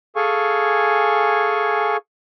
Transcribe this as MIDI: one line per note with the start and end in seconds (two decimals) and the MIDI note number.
0.16 1.97 68
0.16 1.97 69
0.16 1.97 77
0.16 1.97 80
0.16 1.97 85